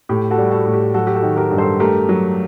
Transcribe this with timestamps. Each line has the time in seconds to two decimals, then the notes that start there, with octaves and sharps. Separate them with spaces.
0.09 A2 G4
0.31 F#4 A4
0.38 G3
0.52 F#4 A4
0.66 A2
0.74 G4
0.94 F#3 F#4 A4
1.07 G4
1.15 F#4 A4
1.22 D#3
1.36 G4 A#4
1.51 G2
1.58 A4 C5
1.80 A3 G4 A#4
2.09 F#3